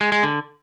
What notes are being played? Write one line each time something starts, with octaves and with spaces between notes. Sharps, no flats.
G#3
G#3
D3